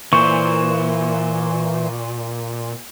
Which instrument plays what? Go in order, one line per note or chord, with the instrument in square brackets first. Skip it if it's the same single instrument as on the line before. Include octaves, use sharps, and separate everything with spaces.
[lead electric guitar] A#2 [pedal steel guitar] E3 C5 [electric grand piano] C#6